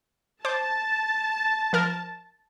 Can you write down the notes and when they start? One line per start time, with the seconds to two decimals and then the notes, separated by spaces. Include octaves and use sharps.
0.45 C5 A5 D6 G6
1.73 F3 A#4 F6